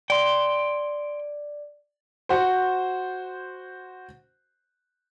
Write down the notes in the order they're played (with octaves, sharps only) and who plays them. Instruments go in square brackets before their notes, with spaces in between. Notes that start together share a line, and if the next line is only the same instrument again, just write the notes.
[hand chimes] D5 [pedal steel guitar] G5 C6
[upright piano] F#4 C5